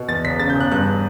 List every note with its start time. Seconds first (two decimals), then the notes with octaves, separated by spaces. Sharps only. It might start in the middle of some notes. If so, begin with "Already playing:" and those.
Already playing: B2
0.08 E2 A6
0.24 E1 B6
0.39 C#3 A6
0.50 G6
0.55 E1
0.60 F#6
0.71 G2 F#6